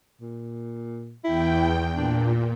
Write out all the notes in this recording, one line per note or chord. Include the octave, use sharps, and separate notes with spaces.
A#2
E2 E4 G5
A#2 D4